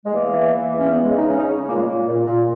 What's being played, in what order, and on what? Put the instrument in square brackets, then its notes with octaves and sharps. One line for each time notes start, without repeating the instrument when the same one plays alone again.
[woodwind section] G#3
E2 A#3
E3
E3
E2
C#4
E2 B3
G#3
C#3
D#4
C#3 C#4
D#4
C#4
C#3
A#2 A#3
G#3
A#2 A#3
A#2
A#2